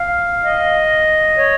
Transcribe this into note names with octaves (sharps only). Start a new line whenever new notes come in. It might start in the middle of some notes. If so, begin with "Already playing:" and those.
Already playing: F5
D#5
C#5